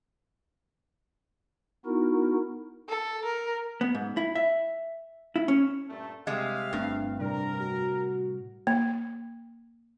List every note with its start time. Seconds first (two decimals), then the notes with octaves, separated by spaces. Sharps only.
1.86 B3 D#4 E4 F#4 A#4
2.89 A4
3.26 A#4
3.81 B3
3.95 G#2
4.17 E4
4.35 E5
5.36 E4
5.48 C#4
5.88 G2 A#2 A3
6.27 C3 G3 G#3 E5 F5
6.73 G1 G2 A3 C4
7.21 A2 C3 G3 D4 A#4
7.61 F#4
8.67 A#3